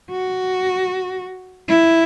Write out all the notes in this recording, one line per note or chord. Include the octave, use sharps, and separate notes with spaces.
F#4
E4